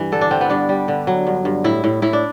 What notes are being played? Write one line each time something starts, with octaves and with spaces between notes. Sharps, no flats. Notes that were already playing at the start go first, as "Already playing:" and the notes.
Already playing: G2 E3
D3 A4
D4
D3 C4
B3
G2 D4
G3
D3
F#3
G2
G2
A2 E4
A2
A2 E4
D4